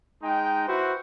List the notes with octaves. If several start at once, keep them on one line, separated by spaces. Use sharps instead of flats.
G#3 D#4 G5
E4 F#4 B4 C5